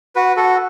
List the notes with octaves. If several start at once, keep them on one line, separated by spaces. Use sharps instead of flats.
F#4 B4
F#4 A4